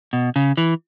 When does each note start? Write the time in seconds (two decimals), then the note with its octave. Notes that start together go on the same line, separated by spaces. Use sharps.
0.13 B2
0.36 C#3
0.57 E3